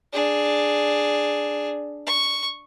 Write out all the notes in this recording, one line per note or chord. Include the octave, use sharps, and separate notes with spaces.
D4 G#4
C#6